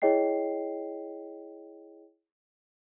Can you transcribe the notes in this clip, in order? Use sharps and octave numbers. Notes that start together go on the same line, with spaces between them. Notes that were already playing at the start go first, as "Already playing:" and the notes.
E4 G#4 C#5 D#5 G5 C7